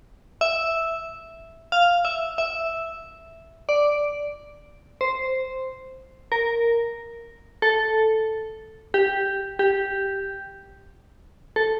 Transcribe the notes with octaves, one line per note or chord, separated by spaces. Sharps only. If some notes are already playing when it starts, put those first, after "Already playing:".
E5
F5
E5
E5
D5
C5
A#4
A4
G4
G4
A4